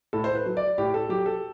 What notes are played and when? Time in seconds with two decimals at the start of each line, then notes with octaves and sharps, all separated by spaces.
0.13 A2 A4
0.24 C5
0.35 B4
0.46 F#3
0.57 D5
0.78 A2 G4
0.94 A4
1.09 F#3 G4
1.26 A4